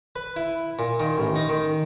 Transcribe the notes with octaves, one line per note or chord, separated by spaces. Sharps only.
B4
E4
A#2
D#3
A1
D#4
D#3